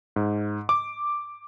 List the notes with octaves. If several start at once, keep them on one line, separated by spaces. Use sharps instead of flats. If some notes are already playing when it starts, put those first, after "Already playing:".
G#2
D6